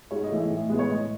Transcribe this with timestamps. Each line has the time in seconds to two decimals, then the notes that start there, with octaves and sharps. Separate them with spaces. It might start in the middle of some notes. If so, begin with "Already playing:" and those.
0.11 G#2 C#5
0.24 D#5
0.30 E3 A3
0.37 E5
0.50 A2
0.69 G#3 B3
0.79 C#5
0.90 A2 D#5